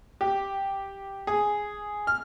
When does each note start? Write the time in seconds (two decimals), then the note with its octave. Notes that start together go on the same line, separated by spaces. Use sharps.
0.21 G4
1.27 G#4
2.07 F6